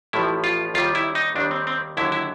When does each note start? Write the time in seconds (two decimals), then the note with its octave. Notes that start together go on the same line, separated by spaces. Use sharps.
0.13 A1 A2 F3 E4
0.44 F4
0.74 D#2 D#3 G3 F4
0.95 E4
1.15 D#4
1.35 D#2 D#3 G3 D4
1.51 C4
1.67 C4
1.97 D#2 D3 F#3 E4
2.12 E4